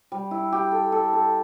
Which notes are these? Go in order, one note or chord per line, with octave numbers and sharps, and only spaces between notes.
G3
E4
G4
A4
A4
A4